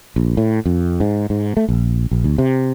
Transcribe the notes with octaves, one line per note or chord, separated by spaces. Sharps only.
A#1
A2
F2
G#2
G#2
A3
A#1
A#1
D2
C3